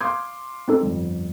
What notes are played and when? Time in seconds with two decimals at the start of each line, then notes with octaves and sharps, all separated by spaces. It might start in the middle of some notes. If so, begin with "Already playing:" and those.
0.01 F5 C6 D6 D#6 G6 G#6
0.68 C4 D#4 A4
0.82 G1 F2